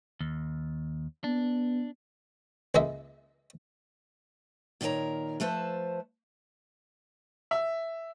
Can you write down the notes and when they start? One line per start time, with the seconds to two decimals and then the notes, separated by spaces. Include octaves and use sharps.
0.21 D#2
1.24 B3 D4
2.75 C#2 G#3 A#3 D#5 E5
4.81 A#2 D#3 A#4 B4 C#5 A#5
5.40 F3 A3 B4 C5 A5
7.51 E5